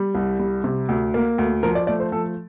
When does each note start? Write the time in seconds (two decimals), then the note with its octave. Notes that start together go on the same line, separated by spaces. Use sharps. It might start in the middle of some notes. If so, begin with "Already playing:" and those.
Already playing: G3
0.15 C2
0.39 G3
0.64 C3
0.89 D2
1.14 A#3
1.38 D2
1.63 F3 A#4
1.75 D5
1.87 A3 D5
2.00 C5
2.12 F3 A4